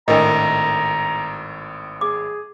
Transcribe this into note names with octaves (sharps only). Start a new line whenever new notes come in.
G#1 A2 D4 A#4 D#5 A#5
G#4 D6